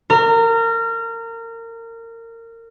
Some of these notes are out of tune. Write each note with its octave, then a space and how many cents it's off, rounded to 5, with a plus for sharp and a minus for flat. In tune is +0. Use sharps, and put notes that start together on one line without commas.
A#4 -25